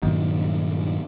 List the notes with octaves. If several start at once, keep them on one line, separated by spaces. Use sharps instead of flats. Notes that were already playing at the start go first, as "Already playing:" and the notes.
G2 A#2 D#3 F#3